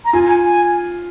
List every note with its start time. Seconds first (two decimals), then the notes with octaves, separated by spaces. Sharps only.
0.05 A#5
0.13 F4 G#5
0.28 G#5
0.44 G#5